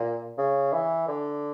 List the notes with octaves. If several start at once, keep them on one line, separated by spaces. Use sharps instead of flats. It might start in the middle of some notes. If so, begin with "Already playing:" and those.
Already playing: A#2
C#3
E3
D3